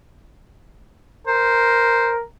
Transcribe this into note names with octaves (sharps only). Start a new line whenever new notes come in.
A#4 C5